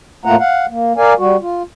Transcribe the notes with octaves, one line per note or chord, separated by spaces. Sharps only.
A2 A3 A#3 F4 F#5 A#5
F5 F#5
A#3
A#4 D5 F5 G#5
G3 F#4
F4